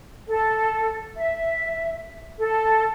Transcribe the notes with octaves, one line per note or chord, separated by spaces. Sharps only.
A4
E5
A4